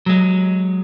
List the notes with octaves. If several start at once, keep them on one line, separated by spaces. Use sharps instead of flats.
F#3 G#3